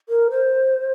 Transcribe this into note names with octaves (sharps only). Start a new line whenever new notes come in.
A#4
C5